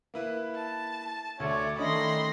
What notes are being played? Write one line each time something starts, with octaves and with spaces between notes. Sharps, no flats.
A#3 E4 B4
A5
D2 A3 C#5 D5
D#3 A3 C#4 D4 D#5 B5 C6 A#6